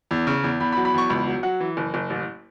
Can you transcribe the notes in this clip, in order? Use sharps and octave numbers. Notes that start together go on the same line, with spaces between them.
E2
C#3
E2
E2 B5
B5
F#3
B5
E2 C#6
C#2 B5
F#3
F#3 F#5
E3
F#1
F#1
A1